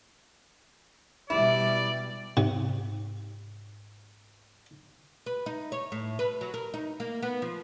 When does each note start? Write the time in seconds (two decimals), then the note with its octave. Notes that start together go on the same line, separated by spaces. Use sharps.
1.30 B2 G3 E4 D5
2.37 G#2 C3
5.26 B4
5.46 D#4
5.72 C#5
5.92 A2
6.19 B4
6.41 F#3
6.54 A#4
6.74 D#4
7.00 A#3
7.22 B3
7.42 F3